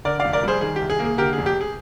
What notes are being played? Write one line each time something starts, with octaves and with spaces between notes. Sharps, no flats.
D3 A#4 D5
D5 F5
F1
A#4 D5
G3 G#4 C5
D#3 G#4
C2 G4
G#4
A#3
G#4
D3 G4 A#4
F1 G#4
G4
G#4